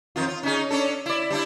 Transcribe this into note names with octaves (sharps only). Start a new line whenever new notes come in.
F2 D#3 F4
F4
C#4 D#4 G#4
C#4 D4 A4
E4 D5
G3 D4 E4